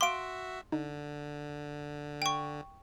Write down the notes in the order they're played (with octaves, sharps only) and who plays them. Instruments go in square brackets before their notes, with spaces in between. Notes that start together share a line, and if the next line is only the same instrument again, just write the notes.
[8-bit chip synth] F#4 E5 [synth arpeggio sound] F5 D6 [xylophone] C6 D7
[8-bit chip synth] D3 [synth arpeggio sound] D#4
[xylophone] G5 C#6